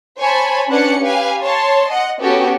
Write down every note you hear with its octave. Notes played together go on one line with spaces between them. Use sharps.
C5 C#5 G#5 A5 B5
C#4 D4 B4 F#5 F#6 C#7
G4 B4 F5 G#5
C#5 A5 C6
D#5 F#5
B3 C#4 F#4 G4 A4